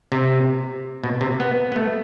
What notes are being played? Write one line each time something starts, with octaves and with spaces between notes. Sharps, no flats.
C3
B2
C3
B3
B3
A3